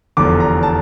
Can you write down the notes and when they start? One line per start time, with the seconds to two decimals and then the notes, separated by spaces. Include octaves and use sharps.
0.17 F1 E2 D3 F3 D6
0.40 A#5
0.63 A5